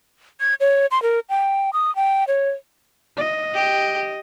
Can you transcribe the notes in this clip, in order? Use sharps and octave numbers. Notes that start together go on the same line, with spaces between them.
G#6
C#5
C6
A#4
G5
D#6
G5
C#5
D#5
G4